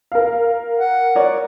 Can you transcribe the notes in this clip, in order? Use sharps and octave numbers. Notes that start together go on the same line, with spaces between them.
A#4 F5
F#5
A#4 C#5 D5